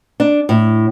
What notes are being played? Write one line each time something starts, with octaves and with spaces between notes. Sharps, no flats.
D4
A2